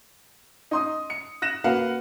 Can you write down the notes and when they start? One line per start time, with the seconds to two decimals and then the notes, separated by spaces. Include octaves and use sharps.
0.71 D#4 C6 D#6
1.10 C#7
1.42 F#6 A#6 E7
1.64 A#3 F#4 B4 F5 F#5